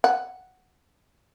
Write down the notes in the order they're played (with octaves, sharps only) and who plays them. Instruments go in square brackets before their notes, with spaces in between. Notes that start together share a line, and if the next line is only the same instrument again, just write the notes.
[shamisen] F#5